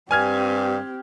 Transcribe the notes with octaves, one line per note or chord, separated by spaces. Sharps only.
G2 C4 G4 G#5 F6 G#6